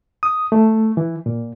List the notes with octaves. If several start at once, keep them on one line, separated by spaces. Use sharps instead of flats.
D#6
A3
E3
A#2